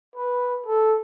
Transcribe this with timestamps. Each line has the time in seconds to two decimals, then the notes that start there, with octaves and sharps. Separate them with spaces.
0.16 B4
0.66 A4